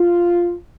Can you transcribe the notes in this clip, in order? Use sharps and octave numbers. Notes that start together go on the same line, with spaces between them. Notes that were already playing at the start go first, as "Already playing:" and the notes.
Already playing: F4